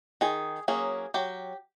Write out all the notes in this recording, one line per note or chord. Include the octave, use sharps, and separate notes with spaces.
D#3 G#4
F#3 A#3 C#4 G#4
F#3 G4